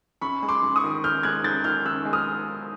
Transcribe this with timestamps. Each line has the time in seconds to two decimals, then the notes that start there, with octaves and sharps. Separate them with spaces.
0.21 F#2 B5 C#6
0.43 G#3
0.48 C6 D6
0.63 F#2
0.76 C#6 D#6
0.84 D#3
1.04 F#2 F6 G6
1.23 G#3 F#6 G#6
1.44 F#2 G6 A6
1.64 D#3 F6 G6
1.86 F#2 E6 F#6
2.05 G#3
2.13 D#6 F6